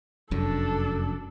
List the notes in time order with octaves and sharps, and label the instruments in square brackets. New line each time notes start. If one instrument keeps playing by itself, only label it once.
[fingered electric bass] F1 F#2 [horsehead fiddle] D4 A4